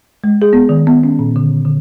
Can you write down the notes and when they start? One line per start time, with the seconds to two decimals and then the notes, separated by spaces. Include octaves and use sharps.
0.24 G#3
0.42 G#4
0.53 B3
0.69 D#3
0.87 B3
1.04 C#4
1.19 A#2
1.36 D3
1.65 D3